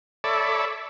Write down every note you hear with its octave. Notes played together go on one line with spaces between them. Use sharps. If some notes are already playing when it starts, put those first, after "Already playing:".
A4 C#5 D5 E5 B5